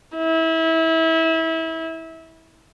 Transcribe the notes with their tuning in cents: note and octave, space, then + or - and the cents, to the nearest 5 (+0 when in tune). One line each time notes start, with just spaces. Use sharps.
E4 -25